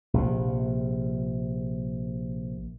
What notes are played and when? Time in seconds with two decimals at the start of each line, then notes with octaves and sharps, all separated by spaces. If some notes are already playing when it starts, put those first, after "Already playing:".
0.14 A#1 C3